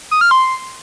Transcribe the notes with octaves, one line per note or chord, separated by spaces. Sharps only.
D#6
F6
C6